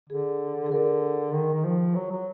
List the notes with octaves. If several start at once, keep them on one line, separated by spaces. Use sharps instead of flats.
D3 G#4
G#4
D3 A#4
D#3
D#3
F3
F#3
F#3